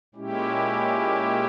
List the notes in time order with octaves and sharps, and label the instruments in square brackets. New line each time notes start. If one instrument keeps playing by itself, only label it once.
[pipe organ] A#2 G#3 C#4 E4 G4